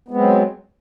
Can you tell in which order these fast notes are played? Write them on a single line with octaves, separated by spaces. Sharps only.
B3 G#3 C4 F#3